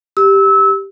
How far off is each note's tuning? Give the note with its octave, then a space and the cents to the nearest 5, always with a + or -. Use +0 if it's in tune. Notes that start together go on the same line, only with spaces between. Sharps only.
G4 +0 E6 -25